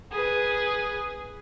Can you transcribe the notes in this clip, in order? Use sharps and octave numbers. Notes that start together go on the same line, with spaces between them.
G#4 B4